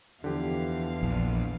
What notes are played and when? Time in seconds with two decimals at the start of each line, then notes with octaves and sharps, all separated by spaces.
0.24 E2 D3 F3 G4 F5
1.03 A#1